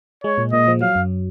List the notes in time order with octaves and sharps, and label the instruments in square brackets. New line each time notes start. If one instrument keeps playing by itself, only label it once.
[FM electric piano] G#3 [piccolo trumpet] C#5
[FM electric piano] A#2
[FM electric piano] A#2 [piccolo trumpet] D#5
[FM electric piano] F3
[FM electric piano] F#3 [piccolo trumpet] F5
[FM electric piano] F#2